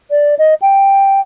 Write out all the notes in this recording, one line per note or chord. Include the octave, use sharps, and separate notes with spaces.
D5
D#5
G5